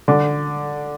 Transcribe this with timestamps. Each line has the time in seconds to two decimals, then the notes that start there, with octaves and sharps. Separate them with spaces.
0.08 D3